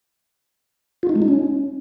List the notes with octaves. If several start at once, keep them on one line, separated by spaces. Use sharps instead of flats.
F4
D#4
G#3
D#4
C#4